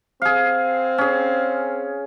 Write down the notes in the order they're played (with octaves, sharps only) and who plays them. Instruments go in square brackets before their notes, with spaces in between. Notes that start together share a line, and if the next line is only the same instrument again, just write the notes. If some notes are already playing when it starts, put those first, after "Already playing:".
[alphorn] C4 [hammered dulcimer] G#4 F5
[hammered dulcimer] C#4 G#4